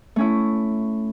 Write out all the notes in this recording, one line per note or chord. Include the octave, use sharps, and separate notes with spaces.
A3 C#4 E4